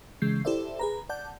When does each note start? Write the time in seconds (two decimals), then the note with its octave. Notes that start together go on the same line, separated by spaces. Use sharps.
0.22 C#3 E3 G#3 G6 C7
0.45 E4 G4 A4 C5 D5 E5
0.79 G#4 B4 A#5
1.09 D5 F#5 A5 G6